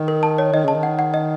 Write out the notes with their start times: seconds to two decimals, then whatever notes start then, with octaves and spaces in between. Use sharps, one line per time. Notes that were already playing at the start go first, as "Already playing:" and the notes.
Already playing: D#3
0.08 A#4
0.23 A5
0.38 C#5
0.53 D#3 D#5
0.64 C#3 A5
0.74 D#3
0.83 F#5
0.99 F#5
1.14 D#5